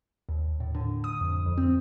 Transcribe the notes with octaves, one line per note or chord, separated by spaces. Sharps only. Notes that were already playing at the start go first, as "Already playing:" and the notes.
D#2
A2
D3
D#6
F2
F2
C4